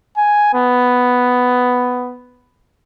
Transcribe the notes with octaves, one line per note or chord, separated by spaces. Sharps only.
G#5
B3